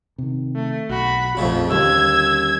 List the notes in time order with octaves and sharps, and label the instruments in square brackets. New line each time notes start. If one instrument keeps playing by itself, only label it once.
[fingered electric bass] C3 D#3
[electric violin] A3
[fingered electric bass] B1 [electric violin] F#4 B5
[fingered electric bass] A#1 [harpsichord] F2 C#3 [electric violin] A3
[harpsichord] D#2 [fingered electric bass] D3 G3 C#4 [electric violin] E6 G#6